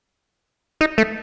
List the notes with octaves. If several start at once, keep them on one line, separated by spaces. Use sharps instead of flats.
D#4
A3